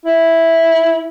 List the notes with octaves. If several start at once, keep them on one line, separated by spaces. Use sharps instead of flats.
E4